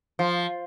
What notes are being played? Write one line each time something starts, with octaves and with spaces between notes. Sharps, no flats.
F3